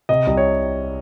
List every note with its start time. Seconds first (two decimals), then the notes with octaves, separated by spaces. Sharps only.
0.09 C3 D#5
0.27 C2
0.37 C#5